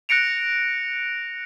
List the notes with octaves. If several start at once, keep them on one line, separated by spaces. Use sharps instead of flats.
F#6 A#6 C#7 D7 F7